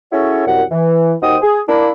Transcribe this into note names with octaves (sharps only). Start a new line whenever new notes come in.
C#4 E4 F#4 G#4 A4 C#5
C2 F#2 F#5
E3
D#2 D#4 F#4 C5 G5 D#6
G#4
A#3 D4 E4